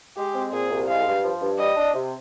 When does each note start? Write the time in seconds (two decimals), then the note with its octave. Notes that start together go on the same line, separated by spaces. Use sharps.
0.17 G#3 G4
0.35 C4
0.52 A#2 G#4
0.70 C2
0.88 G#3 F5
1.06 G2
1.24 F3
1.41 G2
1.58 G3 D#5
1.76 D4
1.94 C3